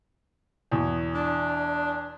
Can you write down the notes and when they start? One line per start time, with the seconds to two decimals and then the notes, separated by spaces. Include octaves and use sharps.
0.72 E2 B2
1.14 D4